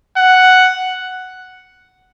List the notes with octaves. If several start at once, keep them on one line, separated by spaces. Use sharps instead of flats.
F#5